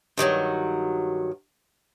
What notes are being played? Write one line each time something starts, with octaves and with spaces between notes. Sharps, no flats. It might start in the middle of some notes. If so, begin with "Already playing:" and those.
G2 D#3 E3 F#3